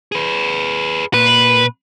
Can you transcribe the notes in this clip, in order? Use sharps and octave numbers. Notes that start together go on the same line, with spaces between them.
G#4 B4
A#2 B4